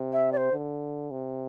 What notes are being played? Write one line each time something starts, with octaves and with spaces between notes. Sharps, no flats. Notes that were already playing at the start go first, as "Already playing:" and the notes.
Already playing: C3
E5
D5
C5
D3
C3